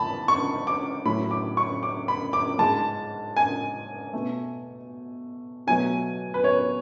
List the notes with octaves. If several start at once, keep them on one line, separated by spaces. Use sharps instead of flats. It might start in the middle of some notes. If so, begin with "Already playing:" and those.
Already playing: G#2 E3 A3 A5 B5
C#6
D6
A2 F#3 A3 B5
D6
C#6
D6
B5
D6
G#2 G#3 A5
G#5
B2 A3
B2 F#3 A3 G#5
B4
C#5